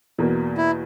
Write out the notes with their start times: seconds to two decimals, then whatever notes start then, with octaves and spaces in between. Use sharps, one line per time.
0.18 E2 B2 A#3
0.58 E4